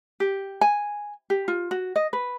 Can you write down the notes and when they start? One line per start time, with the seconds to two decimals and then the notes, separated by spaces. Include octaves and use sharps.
0.20 G4
0.61 G#5
1.30 G4
1.48 F4
1.71 F#4
1.96 D#5
2.13 B4